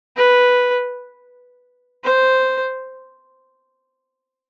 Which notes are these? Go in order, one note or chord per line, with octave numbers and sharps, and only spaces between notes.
B4
C5